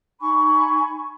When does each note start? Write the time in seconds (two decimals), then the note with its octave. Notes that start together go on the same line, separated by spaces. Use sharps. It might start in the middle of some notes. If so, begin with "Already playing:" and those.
0.20 D#4 G#5 B5 C#6